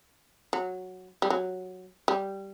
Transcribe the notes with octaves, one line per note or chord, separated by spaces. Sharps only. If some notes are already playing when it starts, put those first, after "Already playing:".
F#3
G3
F#3
G3